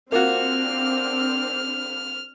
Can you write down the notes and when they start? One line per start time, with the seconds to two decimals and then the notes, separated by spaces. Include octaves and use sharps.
0.12 A#3 C4 D4 F4 F#4 F6